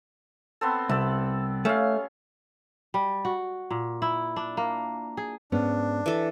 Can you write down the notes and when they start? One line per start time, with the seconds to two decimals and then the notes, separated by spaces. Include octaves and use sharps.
0.61 B3 C4 A4
0.89 C2 G4 D5 E5
1.65 A3 C#4 F5
2.94 G3
3.25 F#4
3.71 A#2
4.02 E4
4.36 D4
4.57 A#3
5.17 G#4
5.52 G#2 B3 C#4 D4
6.06 E3 A4